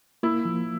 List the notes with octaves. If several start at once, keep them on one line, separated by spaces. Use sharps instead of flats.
A#3 E4
F3